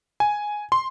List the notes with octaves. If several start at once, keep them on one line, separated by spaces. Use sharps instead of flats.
G#5
C6